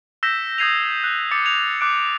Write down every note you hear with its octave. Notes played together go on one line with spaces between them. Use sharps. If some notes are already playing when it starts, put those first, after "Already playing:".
E6 G6 A#6 B6 E7
D#6 G6 G#6 C7 D#7 F7
F#6
D6 A6 C#7
G#6 F7
D6 F#6 D7